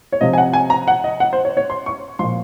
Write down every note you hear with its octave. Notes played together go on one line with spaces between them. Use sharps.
C#5
C3 F3 D#5
G#5
F#5
G#5
A#5
F#5
D#5
F#5
C5
C#5
C#5
C6
C#6
A#2 F3 C6